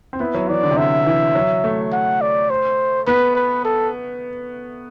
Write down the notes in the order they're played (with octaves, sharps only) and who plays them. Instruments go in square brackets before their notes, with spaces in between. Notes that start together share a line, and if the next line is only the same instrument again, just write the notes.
[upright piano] C4
[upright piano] B3 [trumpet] E4
[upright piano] F#3
[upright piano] E3 [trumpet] D5
[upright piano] D3
C3
[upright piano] D3 [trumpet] E5
[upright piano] E3
F#3
A3
[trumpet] F#5
D5
C5
[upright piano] B3 [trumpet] B4
[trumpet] B4
A4